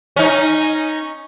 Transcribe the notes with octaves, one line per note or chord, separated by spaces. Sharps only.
C#4 D#4